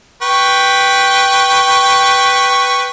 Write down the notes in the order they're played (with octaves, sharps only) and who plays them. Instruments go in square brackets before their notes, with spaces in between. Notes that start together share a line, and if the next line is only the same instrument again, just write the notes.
[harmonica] B4 G5 C#6